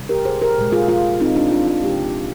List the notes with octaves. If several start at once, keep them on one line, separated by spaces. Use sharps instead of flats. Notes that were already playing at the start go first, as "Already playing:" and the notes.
Already playing: C3 G3
G4 A#4
G#4 C5
G4 A#4
A#2 G#3
F4 G#4
F4 G#4
C4 D#4
D4 F4
D4 F4
D4 F4
C3 F3 G#3 D#4 G4